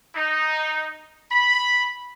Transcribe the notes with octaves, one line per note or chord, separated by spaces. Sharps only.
D#4
B5